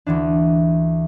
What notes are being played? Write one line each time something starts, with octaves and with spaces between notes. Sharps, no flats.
D2 D3 E3 D4